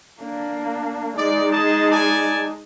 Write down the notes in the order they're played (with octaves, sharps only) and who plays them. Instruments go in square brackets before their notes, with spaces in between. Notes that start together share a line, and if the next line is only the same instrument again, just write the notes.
[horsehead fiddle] A#3 D4
[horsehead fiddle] G#3 D#4 [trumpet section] D5
[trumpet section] G#4 D#5 A5
D5 G#5 A5